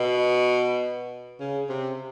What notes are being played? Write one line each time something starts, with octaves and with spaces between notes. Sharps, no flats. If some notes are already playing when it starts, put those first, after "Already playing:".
Already playing: B2
C#3
C3